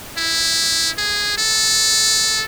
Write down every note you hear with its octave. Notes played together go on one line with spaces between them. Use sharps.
E4
G#4
A4